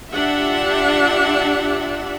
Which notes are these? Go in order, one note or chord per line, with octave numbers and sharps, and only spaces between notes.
D4 F4 G4 E5 F#5